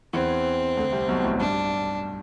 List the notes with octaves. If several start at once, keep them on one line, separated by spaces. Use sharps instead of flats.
E2 E3 C4
D2 D3
C2 C3
B1 B2
A1 A2
G2 D4